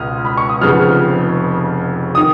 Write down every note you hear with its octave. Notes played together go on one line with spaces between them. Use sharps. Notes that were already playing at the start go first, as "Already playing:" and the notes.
Already playing: C#2 B2 G#3 D#6 F6
B5
C#6
D#6
F1 F2 C#3 F3 B3 F6
D#3 D#6